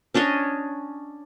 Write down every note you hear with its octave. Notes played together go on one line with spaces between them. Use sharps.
C#4 D4 C#5 D#5